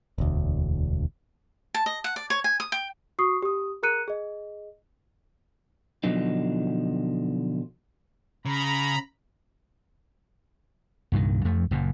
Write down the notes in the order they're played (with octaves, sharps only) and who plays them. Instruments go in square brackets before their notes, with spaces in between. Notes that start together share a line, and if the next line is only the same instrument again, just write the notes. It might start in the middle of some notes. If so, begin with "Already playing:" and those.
[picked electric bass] E1 D2
[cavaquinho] A5
D#5
F#5
D5
C#5
G#5
D#6
G5
[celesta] F#4 C#6 D#6 C7
G4 D#6
G#4 A#4 A#5 F#6 C#7 D#7
G#4 D#5
[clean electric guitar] B2 D3 F3 F#3 D#4
[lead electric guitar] C#3 [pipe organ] A#5 B5
[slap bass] C2 G2 A#2 D#3
F2 F3 A3
F#1 F#2 A#2